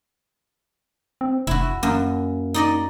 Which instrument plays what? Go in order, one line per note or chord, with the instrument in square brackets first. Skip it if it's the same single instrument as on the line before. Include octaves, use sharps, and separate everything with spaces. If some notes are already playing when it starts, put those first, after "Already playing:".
[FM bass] C4
[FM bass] F1 [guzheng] E4 F#4
[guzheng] F#2 [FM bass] A#3
[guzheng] D#4 D5 D#5